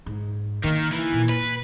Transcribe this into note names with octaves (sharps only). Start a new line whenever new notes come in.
G#2
D#3 A#3
E3
A#2
B4